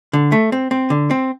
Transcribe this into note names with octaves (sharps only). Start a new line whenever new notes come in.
D3
A3
C4
C4
D3
C4